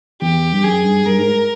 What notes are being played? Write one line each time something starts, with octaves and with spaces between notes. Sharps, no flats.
E2 G4
G2
F#2 G#4
G2
G2 A#4
G#2